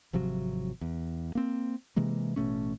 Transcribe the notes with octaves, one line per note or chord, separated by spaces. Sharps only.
G#1 C3 F3 F#3
E2
A#3 C4
C3 E3 G#3 A#3
A1 B2 A3 C#4